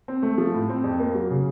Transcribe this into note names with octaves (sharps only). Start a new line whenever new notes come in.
C4
A3
F3
A2
C4
F2
A#3
F#3
C#3